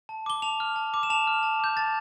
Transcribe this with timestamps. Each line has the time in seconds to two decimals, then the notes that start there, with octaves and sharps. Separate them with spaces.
0.09 A5
0.26 D6 G7
0.42 A5 F7
0.60 F6
0.76 A5
0.94 D6
1.03 E7
1.10 A5 F7
1.27 F6
1.43 A5
1.60 D6 G6
1.77 A5 A6